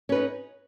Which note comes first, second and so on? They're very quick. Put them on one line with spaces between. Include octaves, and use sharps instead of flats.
C#4 B4 D#4